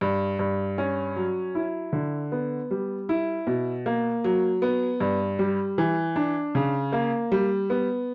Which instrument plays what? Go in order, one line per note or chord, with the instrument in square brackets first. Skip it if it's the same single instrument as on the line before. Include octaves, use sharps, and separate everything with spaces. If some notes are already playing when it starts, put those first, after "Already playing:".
[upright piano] G2
G2
C#4
F#3
E4
D3
B3
G3
E4
B2
A#3
F#3
B3
G2
G3
E3
D4
C#3
A#3
G3
B3